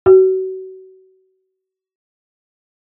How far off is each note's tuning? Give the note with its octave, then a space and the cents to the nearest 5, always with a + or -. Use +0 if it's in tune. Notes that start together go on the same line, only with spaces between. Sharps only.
F#4 +30